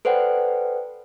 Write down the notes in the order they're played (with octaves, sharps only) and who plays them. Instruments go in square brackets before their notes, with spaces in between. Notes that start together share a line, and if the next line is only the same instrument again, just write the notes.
[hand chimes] A4 B4 C5 D5 F#5 G5